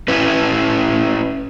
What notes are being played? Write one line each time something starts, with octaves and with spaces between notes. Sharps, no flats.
C#4 E4 B4